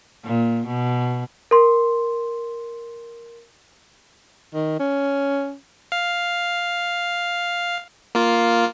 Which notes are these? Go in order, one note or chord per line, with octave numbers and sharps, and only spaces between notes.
A#2
B2
A#4 C6
D#3
C#4
F5
A#3 F4